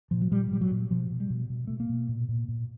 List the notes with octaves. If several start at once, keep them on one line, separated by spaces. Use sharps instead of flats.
A#2 F3
F#3
A#2 G3
A#2 G3
F#3
A#2
B2 F3
B2
G3
B2
B2
B2 A3
A#3
B2
A#2
A#2
A#2